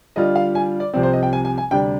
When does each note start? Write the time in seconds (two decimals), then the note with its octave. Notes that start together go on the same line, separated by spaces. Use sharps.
0.16 D3 G3 D4 F4 D#5
0.35 F5
0.55 G#5
0.80 D5
0.93 C2 C3 F3 C4 D5
1.03 C5
1.13 D#5
1.23 G5
1.33 G#5
1.45 G#5
1.58 G#5
1.71 D2 C3 G3 D4 G5